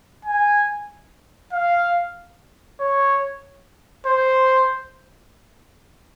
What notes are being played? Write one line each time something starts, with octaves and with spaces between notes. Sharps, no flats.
G#5
F5
C#5
C5